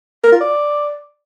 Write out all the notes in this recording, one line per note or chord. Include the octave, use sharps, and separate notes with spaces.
A#4
F4
D5